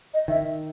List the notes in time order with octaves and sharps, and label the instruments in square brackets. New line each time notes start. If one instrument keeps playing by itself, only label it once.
[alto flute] D#5
[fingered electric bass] D#3 [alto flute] E5